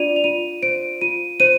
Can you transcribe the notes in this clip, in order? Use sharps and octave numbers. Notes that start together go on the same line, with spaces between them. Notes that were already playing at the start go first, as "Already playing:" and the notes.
Already playing: D4 F4 D5 D#7 F7
F7
F4 D#7
C5 D7
F4 D#7
C5 D#7